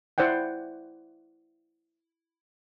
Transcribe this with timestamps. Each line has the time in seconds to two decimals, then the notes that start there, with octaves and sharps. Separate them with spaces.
0.18 E4 C5 D5 F#5 G5